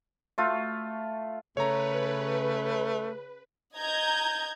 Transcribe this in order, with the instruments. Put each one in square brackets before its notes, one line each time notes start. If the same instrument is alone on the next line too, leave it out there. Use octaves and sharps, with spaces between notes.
[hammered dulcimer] A3 F4
[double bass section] C#3 [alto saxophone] A3 [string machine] B4 [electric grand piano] C#5 A#5
[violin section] D#5 A#5 G6 G#6